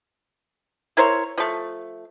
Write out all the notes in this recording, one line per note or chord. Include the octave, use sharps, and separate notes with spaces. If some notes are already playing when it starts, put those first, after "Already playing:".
E4 A#4 C5 C#5
F3 A3